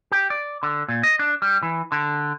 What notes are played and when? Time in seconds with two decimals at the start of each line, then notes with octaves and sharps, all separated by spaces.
0.12 G4
0.30 D5
0.63 D3
0.88 A#2
1.03 D#5
1.19 D4
1.42 G3
1.63 E3
1.92 D3